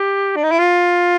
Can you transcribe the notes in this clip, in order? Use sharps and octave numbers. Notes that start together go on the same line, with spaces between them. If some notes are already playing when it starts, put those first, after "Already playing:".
Already playing: G4
D4
D#4
E4
F4